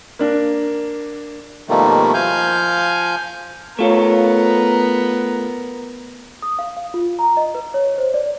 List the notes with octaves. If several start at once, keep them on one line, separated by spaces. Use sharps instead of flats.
A#3 D4 A#4
B2 D#3 F3 G3 A3 A#3
F3 F5 G#5 G6
A3 B3 F4 A#4 C#5
D#6
F5
F5
F4
A#5
D#5
B4
C#5
C5
D5